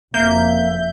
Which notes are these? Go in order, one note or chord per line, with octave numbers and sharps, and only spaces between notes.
F#1 F2 A#3 E5 G6